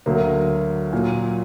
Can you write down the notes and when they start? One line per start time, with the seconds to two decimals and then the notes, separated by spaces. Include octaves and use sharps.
0.06 D2 D3 F#3 A#3
0.93 A#2 F#3